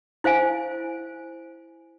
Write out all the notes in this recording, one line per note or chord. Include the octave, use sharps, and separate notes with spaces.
E4 C5 F5 G#5